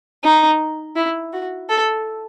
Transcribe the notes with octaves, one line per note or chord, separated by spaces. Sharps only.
D#4
E4
F#4
A4